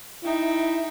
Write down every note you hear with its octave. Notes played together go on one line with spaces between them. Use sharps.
D#4 E4 E5 G5